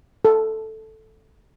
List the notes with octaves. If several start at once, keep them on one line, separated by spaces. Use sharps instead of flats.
A4